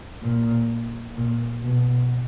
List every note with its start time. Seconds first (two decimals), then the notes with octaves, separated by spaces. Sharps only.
0.23 A#2
1.17 A#2
1.63 B2